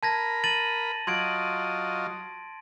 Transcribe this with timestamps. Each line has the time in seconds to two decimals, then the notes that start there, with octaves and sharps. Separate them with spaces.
0.03 A#4 A5 B5 G#6 A#6
0.44 A6 D#7 F#7
1.07 F#3 F4 D#5 C6 G#6 D7